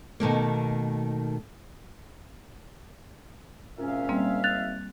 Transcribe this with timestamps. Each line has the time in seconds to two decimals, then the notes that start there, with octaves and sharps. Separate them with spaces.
0.20 B2 D#3 A3 A#3
3.79 G#1 A#2 C#4 E5 F5
4.09 G3 A#3 C4
4.44 F#6 A6 F7